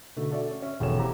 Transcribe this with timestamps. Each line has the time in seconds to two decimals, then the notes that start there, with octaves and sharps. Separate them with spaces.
0.16 B2 D3 A3 D#4
0.30 F#4 A4 D5 E5
0.50 C#4
0.62 C#4 E5
0.80 E1 D#3 A4 C#5 E7
0.98 E4 G4 A4 C5 A#5